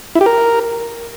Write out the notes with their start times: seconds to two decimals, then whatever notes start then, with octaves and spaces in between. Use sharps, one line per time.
0.15 E4
0.21 G4
0.26 A#4